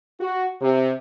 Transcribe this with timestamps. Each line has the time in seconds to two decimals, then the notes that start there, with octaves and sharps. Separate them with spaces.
0.20 F#4
0.61 C3